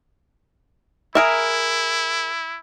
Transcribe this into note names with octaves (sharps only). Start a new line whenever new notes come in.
E4 G#4 A#4 E5